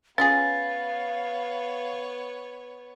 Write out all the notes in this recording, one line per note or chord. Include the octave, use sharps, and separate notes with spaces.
B3 C#4 F4 G#4 C#5 F5 A6